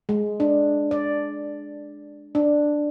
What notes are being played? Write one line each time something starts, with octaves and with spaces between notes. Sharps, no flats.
G#3
D4
D5
D4